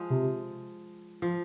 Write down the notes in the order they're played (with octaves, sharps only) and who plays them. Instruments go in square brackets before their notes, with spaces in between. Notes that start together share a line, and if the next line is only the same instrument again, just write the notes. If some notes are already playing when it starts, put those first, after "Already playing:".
Already playing: [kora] F3 G#3
[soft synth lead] C3
[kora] F3